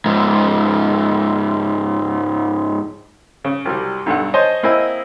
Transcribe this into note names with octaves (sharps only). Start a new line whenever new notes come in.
G#2 F3
C#3
C2 F#3 G3
B1 G2 A4 F#5
C5 C#5 D#5 G#5 A5 C6
A#3 C4 E4 D#5 G#5